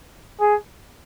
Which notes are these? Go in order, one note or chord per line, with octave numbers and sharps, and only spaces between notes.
G#4